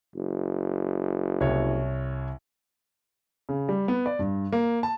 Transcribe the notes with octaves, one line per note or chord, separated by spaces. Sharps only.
F#1
C2 C#5
C#3
G3
B3
D5
G2
A#3
A5